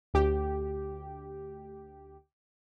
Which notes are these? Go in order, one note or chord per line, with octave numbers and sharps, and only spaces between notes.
D2 G4